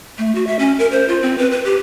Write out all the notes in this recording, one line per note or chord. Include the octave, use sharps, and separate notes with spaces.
A3
F#4
E5
C#4
A#4
C5
F4
C4
B4
B4
G4